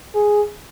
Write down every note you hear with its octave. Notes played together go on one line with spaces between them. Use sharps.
G#4